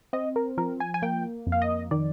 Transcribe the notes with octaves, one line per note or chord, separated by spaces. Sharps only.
C4 D#5
A#4
F3 A#4
G#5
G#5
A#3 G5
F2
F5
D#5
D#3 D5